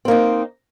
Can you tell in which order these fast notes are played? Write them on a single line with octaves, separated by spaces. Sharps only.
C4 A#3 D#4